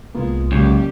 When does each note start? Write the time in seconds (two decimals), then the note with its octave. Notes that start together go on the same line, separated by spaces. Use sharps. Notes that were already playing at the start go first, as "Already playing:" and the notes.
0.15 C2 G#3 A#3 B3 F4
0.52 C#2 F#3 G3 A#3 C#4 G4